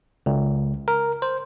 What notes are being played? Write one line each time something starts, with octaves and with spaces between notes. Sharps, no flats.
C#2
A#4
C5